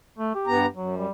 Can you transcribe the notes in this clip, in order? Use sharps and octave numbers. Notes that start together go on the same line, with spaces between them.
A3
G4
G2 B3 A#5
F#2 F#3
G3